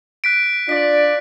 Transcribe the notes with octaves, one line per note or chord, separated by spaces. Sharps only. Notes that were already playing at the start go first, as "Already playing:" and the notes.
F#6 B6 D7
D4 F4 D5 B6